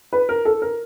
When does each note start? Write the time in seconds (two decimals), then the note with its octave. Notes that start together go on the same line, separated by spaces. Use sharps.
0.13 B4
0.29 A#4
0.45 A4
0.62 A#4